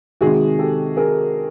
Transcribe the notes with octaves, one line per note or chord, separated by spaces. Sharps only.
C3 D#3 G#3 F#4 G#4
G4 A4
G#4 A#4